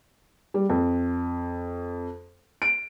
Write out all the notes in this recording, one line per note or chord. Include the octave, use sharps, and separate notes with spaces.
G3
F2
D7